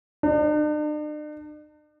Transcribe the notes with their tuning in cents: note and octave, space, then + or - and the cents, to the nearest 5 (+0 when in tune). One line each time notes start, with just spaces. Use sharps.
D4 +45